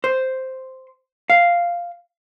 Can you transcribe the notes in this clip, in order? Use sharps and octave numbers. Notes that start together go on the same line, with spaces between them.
C5
F5